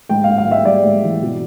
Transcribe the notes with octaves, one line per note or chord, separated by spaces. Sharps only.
G#2 G5
G#2 F5
F5
G#2 E5
G3 D5
G#2
E3
B2